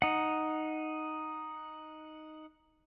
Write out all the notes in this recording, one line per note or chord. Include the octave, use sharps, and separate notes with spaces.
D#4 F#5